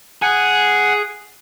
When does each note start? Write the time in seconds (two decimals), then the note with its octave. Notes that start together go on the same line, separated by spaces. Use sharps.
0.22 G#4 F#5